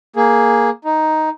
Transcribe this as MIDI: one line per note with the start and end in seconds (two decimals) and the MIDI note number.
0.16 0.70 58
0.16 0.70 68
0.85 1.29 63